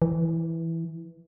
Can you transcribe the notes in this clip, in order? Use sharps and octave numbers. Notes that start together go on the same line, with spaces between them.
E3